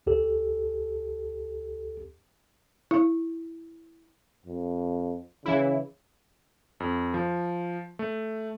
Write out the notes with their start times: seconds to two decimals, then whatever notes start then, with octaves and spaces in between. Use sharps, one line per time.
0.07 D2 G4 A4
2.91 E4
4.46 F2
5.45 C#3 E3 E4
6.80 F2
7.14 F3
7.99 A3